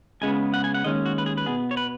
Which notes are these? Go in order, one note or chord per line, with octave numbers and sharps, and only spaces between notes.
C#2 C#3 G#3 B3 G#5
F#5
G#5
F#5
D#2 D#3 G#3 C#4 D#5
F#4
B4
G#4
B4
B2 B3 G#4
C#5
B4